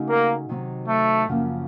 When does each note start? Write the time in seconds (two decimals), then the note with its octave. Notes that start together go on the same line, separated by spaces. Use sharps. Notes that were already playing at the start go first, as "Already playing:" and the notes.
Already playing: C#3 A3 D#4 F#4
0.09 A#3
0.49 C3 D#3 F#3 C4
0.88 A3
1.28 F#2 C#3 F3 A#3